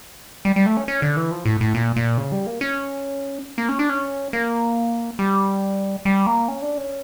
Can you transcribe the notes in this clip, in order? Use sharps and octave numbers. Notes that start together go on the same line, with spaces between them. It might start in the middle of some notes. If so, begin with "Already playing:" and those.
G3
G3
A3
C#4
C#4
D3
E3
F3
A2
A2
A#2
A#2
C#3
G3
A#3
C#4
A#3
C#4
D4
C#4
A#3
G3
G3
A#3
C#4
D4
C#4